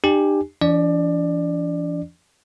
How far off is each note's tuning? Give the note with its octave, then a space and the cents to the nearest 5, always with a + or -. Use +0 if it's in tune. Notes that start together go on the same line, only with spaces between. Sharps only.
D4 +45 G4 +10 G#5 +0
E3 +40 D4 -35 D5 +25